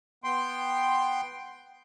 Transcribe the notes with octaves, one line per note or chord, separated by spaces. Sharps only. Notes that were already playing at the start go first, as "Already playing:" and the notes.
B3 G5 C6